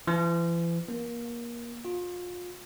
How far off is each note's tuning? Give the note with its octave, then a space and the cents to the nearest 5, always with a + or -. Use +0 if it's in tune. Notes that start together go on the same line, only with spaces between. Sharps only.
E3 +40
A#3 +25
F4 +30